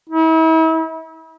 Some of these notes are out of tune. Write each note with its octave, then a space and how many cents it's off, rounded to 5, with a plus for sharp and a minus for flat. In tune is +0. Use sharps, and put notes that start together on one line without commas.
E4 -40